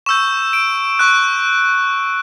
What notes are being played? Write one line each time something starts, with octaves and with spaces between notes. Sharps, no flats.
C#6 E6 G6 E7
D7
C#6 F#6